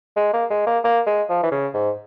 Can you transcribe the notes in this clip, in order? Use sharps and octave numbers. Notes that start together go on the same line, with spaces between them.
G#3
A#3
G#3
A#3
A#3
G#3
F3
E3
C#3
G#2